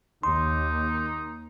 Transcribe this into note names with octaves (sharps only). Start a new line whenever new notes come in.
D#2 D#4 C6